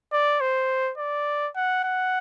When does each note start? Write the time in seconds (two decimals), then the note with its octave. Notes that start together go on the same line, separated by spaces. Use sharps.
0.13 D5
0.41 C5
0.98 D5
1.56 F#5
1.84 F#5